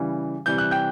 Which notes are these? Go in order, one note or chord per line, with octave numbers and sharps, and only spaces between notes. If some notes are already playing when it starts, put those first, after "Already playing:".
Already playing: C#3 E3 G3
C3 E3 G3 G6
F#6
G5 G6